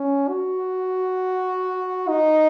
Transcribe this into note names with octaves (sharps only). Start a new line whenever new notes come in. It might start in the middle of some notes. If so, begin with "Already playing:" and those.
Already playing: C#4
F#4
D#4